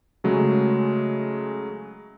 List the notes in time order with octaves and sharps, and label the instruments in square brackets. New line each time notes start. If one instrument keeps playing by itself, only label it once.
[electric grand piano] C#3 F#3 G#3 A3